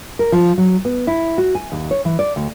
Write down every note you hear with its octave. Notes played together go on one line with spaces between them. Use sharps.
A#4
F3
F#3
B3
E4
F#4
G#5
D#2
C#5
E3
D5
D2